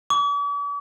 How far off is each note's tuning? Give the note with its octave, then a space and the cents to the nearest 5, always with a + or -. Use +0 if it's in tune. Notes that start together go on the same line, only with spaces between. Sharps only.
D6 -45